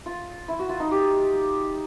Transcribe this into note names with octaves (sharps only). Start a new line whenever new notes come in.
F4
E4
F#4
F4
D#4
G4